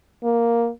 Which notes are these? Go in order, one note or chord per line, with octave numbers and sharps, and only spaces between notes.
A#3